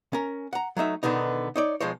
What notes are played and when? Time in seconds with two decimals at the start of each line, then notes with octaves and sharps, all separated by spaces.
0.13 C#4 A#4
0.53 F#5 A#5
0.77 F#3 A3 D#4 E5
1.03 B2 D3 D#3 B3 D#4
1.56 D#4 C#5 D5
1.80 B1 F3 G#3 C5 C#5